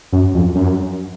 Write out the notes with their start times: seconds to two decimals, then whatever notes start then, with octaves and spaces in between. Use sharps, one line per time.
0.12 F#2
0.34 F2
0.55 F#2